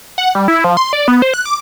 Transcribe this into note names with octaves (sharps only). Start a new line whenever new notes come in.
F#5
G3
E4
F3
C6
D5
B3
C5
F#6
D6